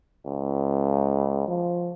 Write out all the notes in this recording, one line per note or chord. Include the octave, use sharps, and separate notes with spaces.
C#2
F3